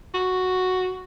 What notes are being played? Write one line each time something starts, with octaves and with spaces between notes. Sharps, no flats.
F#4